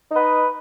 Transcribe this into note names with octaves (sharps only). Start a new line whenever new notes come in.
D#4 B4 D#5